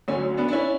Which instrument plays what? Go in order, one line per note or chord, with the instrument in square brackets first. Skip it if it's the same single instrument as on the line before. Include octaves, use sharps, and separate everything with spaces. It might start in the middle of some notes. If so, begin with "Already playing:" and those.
[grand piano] D2 D3 F#3 C#4
B3 D4
D4
C#4 E4